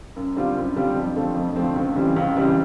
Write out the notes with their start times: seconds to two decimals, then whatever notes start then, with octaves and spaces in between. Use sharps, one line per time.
0.16 F#2
0.36 D3 G3 C4 F4
0.56 F#2
0.76 D3 G3 C4 F4
0.96 F2
1.16 D3 F3 A3 C4
1.35 F2
1.56 D3 F3 A3 C4
1.76 C#2
1.96 C#3 E3 G3 C4
2.16 C#2
2.36 C#3 E3 G3 C4